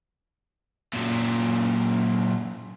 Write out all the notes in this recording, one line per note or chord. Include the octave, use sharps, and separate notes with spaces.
F#2 A#2